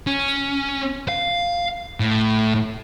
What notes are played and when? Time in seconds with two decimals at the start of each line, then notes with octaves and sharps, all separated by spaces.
0.07 C#4
1.08 F5
2.00 A2